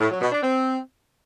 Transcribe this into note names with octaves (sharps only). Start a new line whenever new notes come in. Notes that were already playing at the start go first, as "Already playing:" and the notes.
A2
F#3
B2
D4
C4